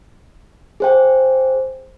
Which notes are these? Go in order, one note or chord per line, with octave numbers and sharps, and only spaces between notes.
G#4 C5 G5